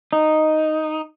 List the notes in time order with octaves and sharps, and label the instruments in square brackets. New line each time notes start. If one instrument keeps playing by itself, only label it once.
[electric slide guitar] D#4